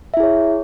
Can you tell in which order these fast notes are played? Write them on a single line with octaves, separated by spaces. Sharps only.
E5 E4 G#4 C#5